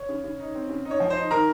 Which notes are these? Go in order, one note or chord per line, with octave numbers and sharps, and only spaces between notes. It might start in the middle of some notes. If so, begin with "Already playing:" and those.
Already playing: C#5
C#3
C#3
D#4
C4
C#3
D#4
C#5
F3
C5
D#4
D#3 A#4 A#5